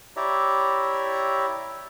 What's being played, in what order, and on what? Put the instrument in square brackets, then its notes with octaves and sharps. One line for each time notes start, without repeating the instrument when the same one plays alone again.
[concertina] E4 G4 C#5 D5 E5 A#5